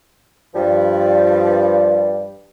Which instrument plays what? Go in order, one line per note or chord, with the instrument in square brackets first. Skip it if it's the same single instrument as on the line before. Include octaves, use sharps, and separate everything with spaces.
[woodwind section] G2 F3 G3